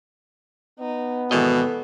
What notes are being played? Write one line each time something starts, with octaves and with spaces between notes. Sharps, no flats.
B3 D#4
G#1 E2 B2 A4 D#5